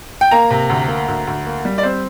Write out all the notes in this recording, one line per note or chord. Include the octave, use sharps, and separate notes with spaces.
G5
A#3 A#5
C3
D2
A#3
D2
D2
A#3
G3
D5
C4 C5